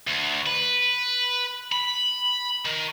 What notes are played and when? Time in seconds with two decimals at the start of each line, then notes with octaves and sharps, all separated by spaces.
0.07 D2
0.46 B4
1.72 B5
2.65 D#3